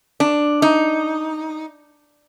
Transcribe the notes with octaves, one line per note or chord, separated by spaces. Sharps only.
D4
D#4